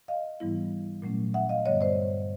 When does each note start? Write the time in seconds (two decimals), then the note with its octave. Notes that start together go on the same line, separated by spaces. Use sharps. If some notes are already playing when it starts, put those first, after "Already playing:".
0.08 D#5 F5
0.40 G#2 E3 G3 B3 E4
1.02 A#2 F#3 A3 C#4
1.34 E5 F#5
1.49 D#5 F5
1.65 G2 D3 G3 B3 C#5 D#5
1.81 C5 D5